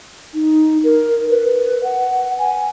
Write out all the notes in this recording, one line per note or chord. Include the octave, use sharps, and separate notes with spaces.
D#4
A#4
B4
F#5
G#5